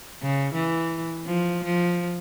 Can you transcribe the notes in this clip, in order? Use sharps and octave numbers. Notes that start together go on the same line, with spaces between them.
C#3
E3
F3
F3